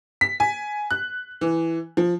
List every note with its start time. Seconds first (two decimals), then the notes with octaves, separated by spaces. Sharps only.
0.21 B6
0.40 G#5
0.91 F#6
1.41 E3
1.97 F3